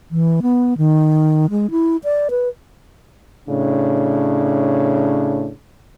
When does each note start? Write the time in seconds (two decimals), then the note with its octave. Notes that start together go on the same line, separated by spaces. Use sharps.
0.11 E3
0.42 B3
0.78 D#3
1.51 G#3
1.71 E4
2.04 D5
2.30 B4
3.48 A2 C#3 D4